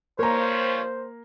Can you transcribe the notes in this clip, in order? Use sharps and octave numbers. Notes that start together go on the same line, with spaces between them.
G2 F3 A#3 C5 C#5 A#5